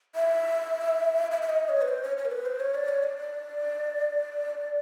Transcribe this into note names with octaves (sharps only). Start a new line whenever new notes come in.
E5
E5
E5
D#5
C#5
B4
C5
C#5
C#5
A#4
B4
C5
C#5
D5
C#5
D5